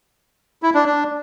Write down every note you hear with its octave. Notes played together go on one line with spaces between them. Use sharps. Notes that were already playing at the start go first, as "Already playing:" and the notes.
E4
D4
D4